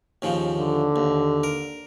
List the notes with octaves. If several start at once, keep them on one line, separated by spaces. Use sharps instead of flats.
D#2 C#3 F3
D3
D#2
A#4